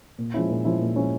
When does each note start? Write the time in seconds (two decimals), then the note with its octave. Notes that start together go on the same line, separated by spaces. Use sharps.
0.18 A#2
0.34 F3 G#3 C#4 E4
0.49 A#2
0.65 F3 G#3 C#4 E4
0.80 A#2
0.95 F3 G#3 C#4 E4